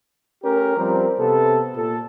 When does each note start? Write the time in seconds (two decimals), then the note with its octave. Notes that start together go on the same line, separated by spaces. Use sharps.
0.43 A3 C#4 G4 A#4
0.78 F3 G3 C4 A#4
1.19 C3 B3 A4
1.75 A#2 A4